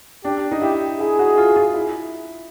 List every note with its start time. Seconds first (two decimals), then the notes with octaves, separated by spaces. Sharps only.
0.25 D4 G4
0.52 D#4
0.62 E4 G4
1.00 E4 G#4
1.19 F#4
1.38 F4
1.56 F4
1.74 E4